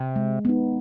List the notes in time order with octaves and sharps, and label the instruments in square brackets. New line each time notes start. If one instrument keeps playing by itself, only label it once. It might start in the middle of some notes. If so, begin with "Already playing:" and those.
Already playing: [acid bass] C3
[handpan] G#3
B3 D#4